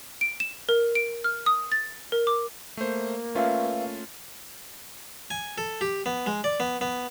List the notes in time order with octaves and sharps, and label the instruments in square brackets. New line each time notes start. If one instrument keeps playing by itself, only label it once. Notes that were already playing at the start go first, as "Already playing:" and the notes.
[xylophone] D7
E7
A#4
D7
F6
D#6
A6
A#4
D6
[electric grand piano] A3 C5 [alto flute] A#3
[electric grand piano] A3 C#4 F4 [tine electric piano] B4 E5 F5
[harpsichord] G#5
A4
G4
B3
G#3
D5
B3
B3